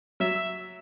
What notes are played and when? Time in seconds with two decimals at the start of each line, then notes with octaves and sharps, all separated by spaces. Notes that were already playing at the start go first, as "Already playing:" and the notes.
0.20 F#3 E5